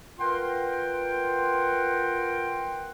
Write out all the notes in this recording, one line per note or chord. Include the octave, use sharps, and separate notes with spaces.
F4 A#4 B4 F#5 G5 C6